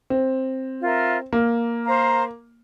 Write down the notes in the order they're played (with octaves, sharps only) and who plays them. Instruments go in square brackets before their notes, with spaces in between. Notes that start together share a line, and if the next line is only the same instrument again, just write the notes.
[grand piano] C4
[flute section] F4 A#4 E5
[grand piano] A#3
[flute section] C5 F5 A#5